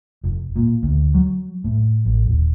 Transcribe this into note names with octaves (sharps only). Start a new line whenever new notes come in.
F1
A#2
D2
F#3
A2
A1
D#1